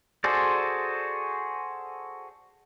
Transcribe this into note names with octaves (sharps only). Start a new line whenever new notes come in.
F#4 G#4 A4 C5 D5